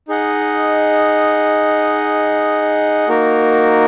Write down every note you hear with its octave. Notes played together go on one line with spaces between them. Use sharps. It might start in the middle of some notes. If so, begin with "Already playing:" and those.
D#4 G#4 D#5 F#5
A#3 D#4 F#4 A#4